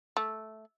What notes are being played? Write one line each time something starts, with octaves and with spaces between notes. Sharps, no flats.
A3